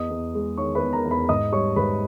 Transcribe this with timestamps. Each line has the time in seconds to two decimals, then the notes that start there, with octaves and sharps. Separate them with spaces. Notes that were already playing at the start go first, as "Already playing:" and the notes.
Already playing: E2 D#5 D#6
0.10 E2
0.34 G#3
0.57 D#3 C#5 C#6
0.75 B4 B5
0.82 E2
0.93 A#4 A#5
1.05 E2
1.11 B4 B5
1.29 G#2 D#5 D#6
1.52 G3 C#5 C#6
1.76 G#2 B4 B5